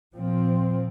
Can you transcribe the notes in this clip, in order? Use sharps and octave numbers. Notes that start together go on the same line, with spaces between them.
A#2 F3 C4